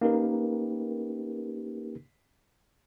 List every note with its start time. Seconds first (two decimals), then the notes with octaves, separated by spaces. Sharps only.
0.01 A#3 C#4 D#4 G4 A#4 B4